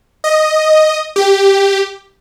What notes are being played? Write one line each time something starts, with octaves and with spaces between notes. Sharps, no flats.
D#5
G4